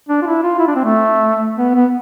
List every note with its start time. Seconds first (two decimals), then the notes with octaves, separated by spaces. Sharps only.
0.09 D4
0.22 F4
0.26 E4
0.43 F4
0.59 E4
0.68 D4
0.76 C4
0.84 A3
1.59 B3
1.75 B3